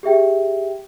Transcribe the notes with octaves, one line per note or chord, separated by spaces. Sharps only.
G4 G#4 E5 G5